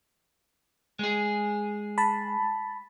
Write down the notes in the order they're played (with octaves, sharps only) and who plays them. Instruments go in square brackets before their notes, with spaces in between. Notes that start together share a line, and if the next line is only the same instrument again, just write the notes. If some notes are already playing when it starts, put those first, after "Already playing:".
[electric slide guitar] G#3 G#4
[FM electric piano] A5 B5